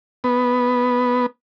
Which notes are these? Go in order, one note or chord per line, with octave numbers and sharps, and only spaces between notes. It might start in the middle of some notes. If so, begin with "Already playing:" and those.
B3